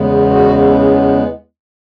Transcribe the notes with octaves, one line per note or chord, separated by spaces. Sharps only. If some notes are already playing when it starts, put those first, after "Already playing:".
Already playing: E2 C#3 G#3 B3
F#4